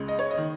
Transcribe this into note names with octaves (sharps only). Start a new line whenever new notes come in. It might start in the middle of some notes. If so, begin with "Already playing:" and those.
Already playing: C#2 C#3 G#3
D#5
C#5
D#5
D#3